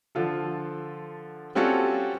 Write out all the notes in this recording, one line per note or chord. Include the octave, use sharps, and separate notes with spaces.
D3 F3 F4 A4
G3 C4 C#4 F4 F#4 A4